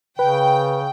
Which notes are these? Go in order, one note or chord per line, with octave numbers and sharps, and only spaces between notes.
C#3 B4 G5